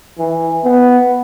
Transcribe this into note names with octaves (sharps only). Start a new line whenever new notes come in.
E3
B3